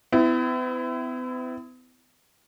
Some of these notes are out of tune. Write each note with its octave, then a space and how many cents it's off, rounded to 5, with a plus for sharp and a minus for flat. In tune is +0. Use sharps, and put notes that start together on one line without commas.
B3 +45 E4 +0